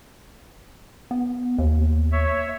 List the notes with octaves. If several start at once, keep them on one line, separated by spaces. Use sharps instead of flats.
B3
D#2
C#5 E5